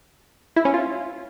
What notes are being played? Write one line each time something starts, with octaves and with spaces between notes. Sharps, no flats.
E4
C#4
F4